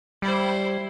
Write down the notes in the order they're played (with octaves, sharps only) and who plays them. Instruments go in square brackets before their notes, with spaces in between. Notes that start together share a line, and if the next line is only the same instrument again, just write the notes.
[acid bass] G3 [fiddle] E4 C5